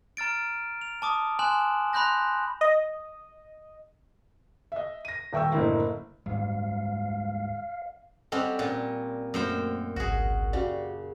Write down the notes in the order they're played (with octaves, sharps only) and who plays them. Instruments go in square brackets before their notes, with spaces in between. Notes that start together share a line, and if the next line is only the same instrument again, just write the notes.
[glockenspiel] A#5 F6 A6 D7
F7
A5 D6 D#6
G#5 C6 F#6 E7 F#7
B5 C6 F#6 G6 A#6
[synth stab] D#5
[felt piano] D#5 E5
A#6 D#7
D#1 E5 G5 C#6 E6
F#1 A2 D3 A#3 E4
[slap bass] D2 G#2 G3 [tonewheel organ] F5
[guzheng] G3 C4 C#4 [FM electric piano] A4 D#5 F#5
[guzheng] A#2 [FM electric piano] C#4
[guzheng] F#2 C5 G5 [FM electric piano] F#3 A3 A#3
[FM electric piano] G#1 C#2 [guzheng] F#4 G#4
[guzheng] C#3 [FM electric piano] F#4 G4 D5